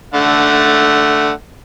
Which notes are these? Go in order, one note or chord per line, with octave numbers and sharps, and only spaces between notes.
D3 A3 F#5